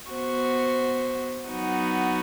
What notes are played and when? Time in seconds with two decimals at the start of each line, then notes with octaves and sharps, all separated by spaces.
0.12 B3 F#4 C5
1.49 F#3 B3 D#4 F#4